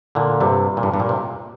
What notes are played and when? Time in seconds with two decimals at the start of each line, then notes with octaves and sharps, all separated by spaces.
0.15 A#2 D3
0.41 G2 C3
0.77 A#2
0.83 G2
0.94 G2
1.00 A#2
1.09 C3